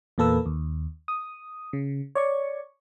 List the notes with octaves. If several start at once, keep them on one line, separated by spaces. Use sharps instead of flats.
E2 A#2 A#3 A4 B4 E6
D#2
D#6
C#3
C#5 D5 C#6